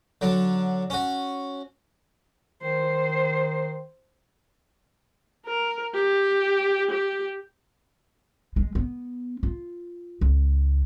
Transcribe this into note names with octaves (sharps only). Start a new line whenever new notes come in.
D3 F#3 D4
C#4 F#4
D#3 C5
A#4
G4
G4
G#3
B3
F4
C#2